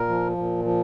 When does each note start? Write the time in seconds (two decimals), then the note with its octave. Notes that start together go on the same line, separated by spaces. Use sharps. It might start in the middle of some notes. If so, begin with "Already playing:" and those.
Already playing: A#2 A#4
0.09 F3
0.37 A#2
0.65 F3